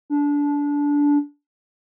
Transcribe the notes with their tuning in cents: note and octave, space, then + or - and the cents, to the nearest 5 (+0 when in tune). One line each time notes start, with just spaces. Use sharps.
D4 -20